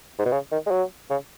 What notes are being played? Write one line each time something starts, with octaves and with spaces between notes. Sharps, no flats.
G#2
B2
C#3
D#3
G#3
F#3
C#3